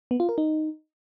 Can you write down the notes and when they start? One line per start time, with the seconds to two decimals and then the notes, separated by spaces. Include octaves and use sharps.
0.11 B3
0.20 F4
0.29 A#4
0.38 D#4